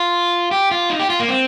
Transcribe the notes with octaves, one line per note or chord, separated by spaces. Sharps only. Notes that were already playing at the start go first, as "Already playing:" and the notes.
Already playing: F4
G4
F4
D#4
G4
F4
A#3
C4